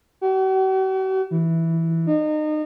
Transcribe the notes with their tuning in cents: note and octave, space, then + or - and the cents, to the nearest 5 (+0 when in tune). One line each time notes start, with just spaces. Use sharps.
F#4 +45
E3 -5
D#4 -30